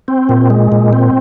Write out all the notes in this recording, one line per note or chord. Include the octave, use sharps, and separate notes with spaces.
C4
A#2
G#3
A#2
C4